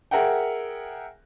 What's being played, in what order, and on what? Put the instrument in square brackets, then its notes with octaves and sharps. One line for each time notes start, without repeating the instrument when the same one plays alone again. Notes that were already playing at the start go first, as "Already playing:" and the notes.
[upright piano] G#4 A#4 E5 F#5 G5